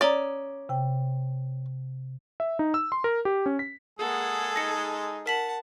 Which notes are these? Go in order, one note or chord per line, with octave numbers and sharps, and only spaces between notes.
C#4 D5 A#5 D#6
C3 G5
E5
D#4
E6
C6
A#4
G4
C#4
B6
G#3 A#3 G#4 A4 F#5
D#4 A#6 C#7
A#4 F#5 A5 B6 F#7